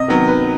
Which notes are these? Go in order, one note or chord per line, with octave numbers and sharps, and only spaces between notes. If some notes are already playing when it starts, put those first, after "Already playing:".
Already playing: C3 D#5
D#3 F#3 B3
B4